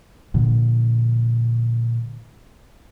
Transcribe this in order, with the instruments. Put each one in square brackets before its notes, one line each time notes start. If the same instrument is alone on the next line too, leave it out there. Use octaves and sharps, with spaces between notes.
[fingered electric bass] A#2 D3 F3